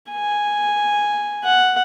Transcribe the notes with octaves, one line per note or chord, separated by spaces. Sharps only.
G#5
F#5